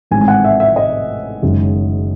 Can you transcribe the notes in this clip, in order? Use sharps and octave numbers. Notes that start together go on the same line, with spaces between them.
A1 G#2 D#3 G#3 C4 G#5
G#5
F#5
E5
E5
D#5
F#1 F#2 D#3 G#3 C#4